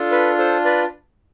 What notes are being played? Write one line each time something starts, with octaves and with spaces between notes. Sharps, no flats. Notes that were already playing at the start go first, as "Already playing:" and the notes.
Already playing: D4 F4 A4
B4
A4 C5
B4 D5